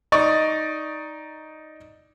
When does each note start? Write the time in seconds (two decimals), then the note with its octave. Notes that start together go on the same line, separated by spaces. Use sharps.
0.12 D#4 D5 D#5 C#6